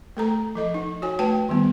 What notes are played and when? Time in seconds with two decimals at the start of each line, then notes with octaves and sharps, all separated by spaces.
0.17 A3 A4 A#5
0.55 F3 A4 D#5
0.74 D#4
1.02 F#4 C#5 G#5
1.19 A3 F#4 B4 G5 A5
1.49 D#3 G3 B3